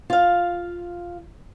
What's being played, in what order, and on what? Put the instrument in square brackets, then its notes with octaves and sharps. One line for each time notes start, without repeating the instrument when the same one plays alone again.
[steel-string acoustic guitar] F4 F5